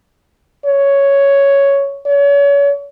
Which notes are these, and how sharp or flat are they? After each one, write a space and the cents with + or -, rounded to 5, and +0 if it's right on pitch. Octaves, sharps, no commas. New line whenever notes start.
C#5 +5
C#5 +35